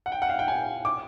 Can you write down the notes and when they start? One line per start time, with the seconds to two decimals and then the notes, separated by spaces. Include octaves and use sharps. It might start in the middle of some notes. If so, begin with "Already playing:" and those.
0.06 F#5
0.12 G5
0.22 F#5
0.30 F5
0.39 G5
0.48 G#5
0.85 D6